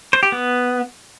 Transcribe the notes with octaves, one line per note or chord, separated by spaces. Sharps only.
C5
G4
B3